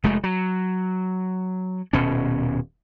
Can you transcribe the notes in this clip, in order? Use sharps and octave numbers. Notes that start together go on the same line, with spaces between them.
F1 G#3 A3
F#3
D#1 B2 C#4